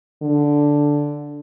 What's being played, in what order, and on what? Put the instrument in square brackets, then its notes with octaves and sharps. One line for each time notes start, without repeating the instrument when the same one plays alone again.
[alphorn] D3